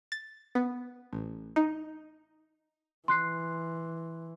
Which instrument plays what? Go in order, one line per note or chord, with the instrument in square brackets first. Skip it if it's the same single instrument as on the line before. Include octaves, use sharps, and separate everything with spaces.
[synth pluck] A6
B3
A1
D#4
[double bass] E3 [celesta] C6 F#6 C7